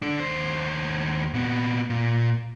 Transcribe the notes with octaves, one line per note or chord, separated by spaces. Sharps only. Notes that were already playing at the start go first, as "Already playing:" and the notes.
D4 A4
D#2 C5
A#2 B3
A#2